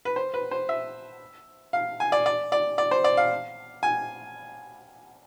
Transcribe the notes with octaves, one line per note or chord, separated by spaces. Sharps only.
B4
C5
B4
C5
E5
F5
G#5
D5
D5
D5
D5
C5
D5
F5
G#5